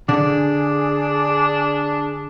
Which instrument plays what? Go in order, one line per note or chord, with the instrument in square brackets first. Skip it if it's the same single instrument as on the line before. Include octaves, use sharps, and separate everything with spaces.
[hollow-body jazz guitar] D3 [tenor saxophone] D4 [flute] G#4